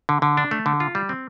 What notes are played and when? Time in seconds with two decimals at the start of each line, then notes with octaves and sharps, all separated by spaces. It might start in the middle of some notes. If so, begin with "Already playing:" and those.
0.09 D3
0.22 D3
0.37 D4
0.51 A3
0.66 D3
0.80 F4
0.95 G3
1.09 C4